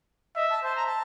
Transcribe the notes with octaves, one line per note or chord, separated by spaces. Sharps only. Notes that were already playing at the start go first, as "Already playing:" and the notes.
D#5 E5
A5
C5 A5
A#5
A5